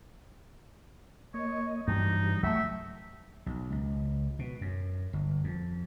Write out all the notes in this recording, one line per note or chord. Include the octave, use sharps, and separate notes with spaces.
A#3 C#5 D#5
G2 E3 F#3 G3 D#4
F#3 A3 E5 G5 C#6
B1
C#2
B2
F#2
G1
F2